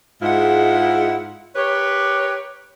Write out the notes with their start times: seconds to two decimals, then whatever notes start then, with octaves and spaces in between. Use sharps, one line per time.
0.22 G#2 G#3 E4 F4 F#5
1.56 G4 A#4 B4 C#5